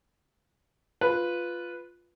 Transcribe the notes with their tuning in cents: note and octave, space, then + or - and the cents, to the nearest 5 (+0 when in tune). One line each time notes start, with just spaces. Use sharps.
F4 +0 B4 +0